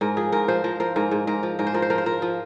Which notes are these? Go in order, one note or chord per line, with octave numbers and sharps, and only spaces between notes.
G#2 A#4
F3 G#4
G#2 A#4
F3 C5
F3 A#4
F3 A#4
G#2 A#4
G#2
G#2 A#4
F3
G#2 A#4
C5
F3 A#4
C5
F3 A#4
C5
F3 A#4
F3